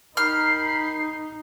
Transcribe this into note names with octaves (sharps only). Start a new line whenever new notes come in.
D#4 G4 A#4 B5 F6 C7